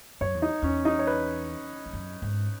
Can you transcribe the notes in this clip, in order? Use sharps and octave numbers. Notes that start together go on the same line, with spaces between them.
F#2 C#5
E2
D#4
E2 C#4
D#4
C#5
B4
E2
F#2
G#2